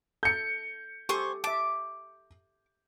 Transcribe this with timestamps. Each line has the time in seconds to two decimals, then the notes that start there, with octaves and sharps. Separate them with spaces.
0.23 A4 G6 C#7
1.09 G4 A4 C5 G#5 C#6
1.44 E5 A5 D6